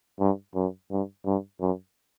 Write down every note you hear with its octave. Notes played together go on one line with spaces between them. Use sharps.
G2
F#2
G2
G2
F#2